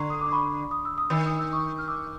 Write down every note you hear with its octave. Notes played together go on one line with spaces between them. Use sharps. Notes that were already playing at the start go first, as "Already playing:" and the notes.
Already playing: D3 A#5 C6 C#6
D#6
D6
B5 C#6
D#6
E6
D#6
D#3 E6
D#6
E6
C#6 D#6
F6
D6 E6